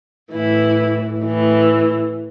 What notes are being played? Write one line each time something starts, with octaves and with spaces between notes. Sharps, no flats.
A2 E3 E4
A2 E3